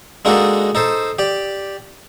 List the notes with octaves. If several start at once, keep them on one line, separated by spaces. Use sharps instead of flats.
G#3 A#3 D4 D#4 F#4 A4
D#4 A4 C5
G4 D5